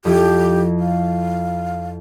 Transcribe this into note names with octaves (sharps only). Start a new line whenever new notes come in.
F2 F3 E4 G4
F5